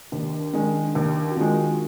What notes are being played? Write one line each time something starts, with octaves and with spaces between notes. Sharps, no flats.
D#2 D4
D#3 G#3 D4
D#2 D#4
F#4
D#3 G#3 F4